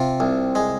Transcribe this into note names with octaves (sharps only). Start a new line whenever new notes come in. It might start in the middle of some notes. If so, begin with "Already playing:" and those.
Already playing: C3 F4
C2
G#3